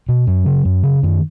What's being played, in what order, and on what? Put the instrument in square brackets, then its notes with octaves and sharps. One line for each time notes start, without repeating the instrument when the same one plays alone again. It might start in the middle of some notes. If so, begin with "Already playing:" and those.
[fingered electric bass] B2
F#2 F#3
C#3
F#2
C#3
F#2 D#3